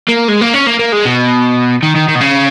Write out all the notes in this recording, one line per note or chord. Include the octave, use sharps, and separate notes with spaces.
A#3
G#3
A#3
C#4
A#3
A#3
G#3
B2
D#3
D#3
D#3
B2
C#3